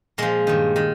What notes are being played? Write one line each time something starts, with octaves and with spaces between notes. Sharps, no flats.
A#2 F3 G#3
G2 D#3
D#3